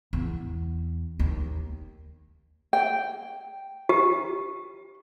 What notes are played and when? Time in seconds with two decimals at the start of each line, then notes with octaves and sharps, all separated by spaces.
0.13 E2
1.19 D#2
2.73 G5
3.89 G4